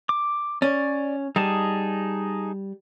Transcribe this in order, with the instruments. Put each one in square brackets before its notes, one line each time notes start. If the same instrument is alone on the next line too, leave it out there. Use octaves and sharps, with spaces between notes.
[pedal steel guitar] D6
[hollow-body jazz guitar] C#4 [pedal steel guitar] D5
[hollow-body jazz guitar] G3 [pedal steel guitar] D#4 G#4 A5